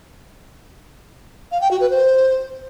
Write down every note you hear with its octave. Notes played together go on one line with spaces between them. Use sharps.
F5
G5
F#4
B4
C5